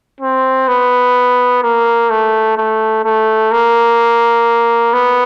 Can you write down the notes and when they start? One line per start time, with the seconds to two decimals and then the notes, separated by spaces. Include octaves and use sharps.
0.20 C4
0.68 B3
1.63 A#3
2.10 A3
2.57 A3
3.05 A3
3.52 A#3
4.93 B3